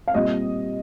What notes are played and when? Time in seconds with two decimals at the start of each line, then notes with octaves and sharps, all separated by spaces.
0.08 F5
0.14 A#2 G3 C4 F4 D#5